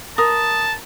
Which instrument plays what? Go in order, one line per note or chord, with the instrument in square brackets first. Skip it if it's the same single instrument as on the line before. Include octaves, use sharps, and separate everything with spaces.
[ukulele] A#4 [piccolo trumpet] A5 [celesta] D#6